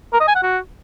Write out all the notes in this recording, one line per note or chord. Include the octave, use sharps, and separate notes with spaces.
A#4
D#5
G#5
F#5
F#4